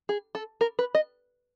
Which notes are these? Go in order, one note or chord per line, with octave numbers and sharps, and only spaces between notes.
G#4
A4
A#4
B4
D#5